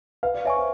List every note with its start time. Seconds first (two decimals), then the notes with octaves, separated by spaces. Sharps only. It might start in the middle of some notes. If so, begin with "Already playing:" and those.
0.23 B4 F5
0.34 D5
0.45 C#5 E5 G#5 C#6
0.57 C5